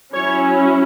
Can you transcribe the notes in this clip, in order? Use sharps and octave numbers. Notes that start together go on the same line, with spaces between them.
F#3 C#4 E4 C#5